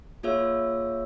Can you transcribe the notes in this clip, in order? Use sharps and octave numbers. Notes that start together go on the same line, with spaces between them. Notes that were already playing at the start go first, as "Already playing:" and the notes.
A#3 F4 G#4 C#5 E5 E6